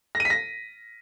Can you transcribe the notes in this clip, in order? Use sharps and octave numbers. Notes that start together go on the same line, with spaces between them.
A#6
D#7
B6
A#6